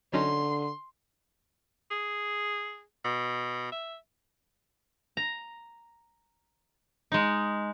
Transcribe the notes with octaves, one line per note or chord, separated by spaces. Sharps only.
D3 F#3 C#4 D#4 C6
G#4
B2
E5
A#5
G#3 D#4